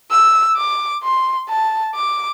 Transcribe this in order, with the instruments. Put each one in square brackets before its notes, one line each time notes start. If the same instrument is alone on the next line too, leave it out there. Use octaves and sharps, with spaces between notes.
[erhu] E6
D6
C6
A5
D6